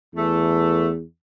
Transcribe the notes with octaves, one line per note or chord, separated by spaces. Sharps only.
E2 E3 A3